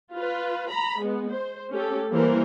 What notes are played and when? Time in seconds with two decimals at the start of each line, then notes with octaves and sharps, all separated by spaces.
0.14 F4 B4
0.71 A#5 B5
1.00 G#3 B3
1.32 C5
1.71 A3 C#4 G4 A4
2.12 E3 G3 A#3 A#4 C5